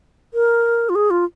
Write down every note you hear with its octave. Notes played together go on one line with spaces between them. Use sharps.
A#4
F4
G#4
F4